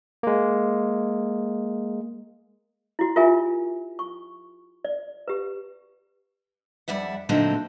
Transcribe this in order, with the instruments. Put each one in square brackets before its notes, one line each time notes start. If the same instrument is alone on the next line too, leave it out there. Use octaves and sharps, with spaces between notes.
[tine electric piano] G#3 A#3
[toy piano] E4 F#4
F4 G4 A#4 E5 G#5
C#6
D5
G4 B4
[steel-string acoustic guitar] F2 G3 D5 E5 F#5
A#2 D3 F#3 A3 C4 D#4